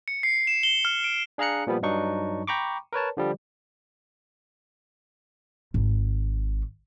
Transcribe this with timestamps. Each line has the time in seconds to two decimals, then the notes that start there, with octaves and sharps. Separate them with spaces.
0.08 C#7
0.23 C7
0.47 E7
0.63 G7
0.85 F6
1.04 D7
1.38 D4 G#4 F5 A#5 F#6 C#7
1.67 A#2 F3 G3 B3
1.82 G2 F#3 D4 D#4 C#6
2.47 G5 A#5 B5 C#6 D6
2.93 A#4 B4 C#5 A5
3.17 D3 F3 G3
5.74 G#1